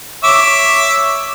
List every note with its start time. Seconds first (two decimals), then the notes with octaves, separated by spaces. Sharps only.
0.24 C#5 E5 D6